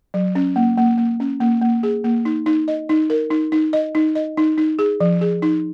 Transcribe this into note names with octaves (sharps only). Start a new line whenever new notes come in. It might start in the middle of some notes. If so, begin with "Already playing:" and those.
F#3
C#4
A#3
A#3
A#3
C#4
A#3
A#3
G#4
A#3
D#4
D#4
D#5
D#4
A#4
D#4
D#4
D#5
D#4
D#5
D#4
D#4
G#4
F3
G#4
D#4